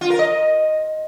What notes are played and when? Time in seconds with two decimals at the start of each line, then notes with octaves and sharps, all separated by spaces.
0.01 F4
0.10 A#4
0.19 D#5